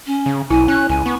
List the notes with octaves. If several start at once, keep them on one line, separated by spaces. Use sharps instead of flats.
C#4
C#3
B1 E4 G#5
C#4 F#6
C#2 G#5
B3 C#6